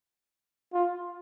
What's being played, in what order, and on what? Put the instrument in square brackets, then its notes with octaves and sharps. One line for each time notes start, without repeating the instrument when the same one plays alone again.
[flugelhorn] F4